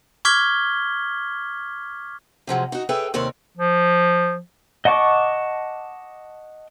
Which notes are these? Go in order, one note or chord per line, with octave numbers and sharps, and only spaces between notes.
C#6 D6 F6 G#6 B6 G7
C3 F3 F#3 G#3
D#4 F#4
G#4 A4 B4 C#5 E5 G5
D#2 C3 C4 A#4 C#5 D5
F3
D#5 F#5 A5 C#6 D6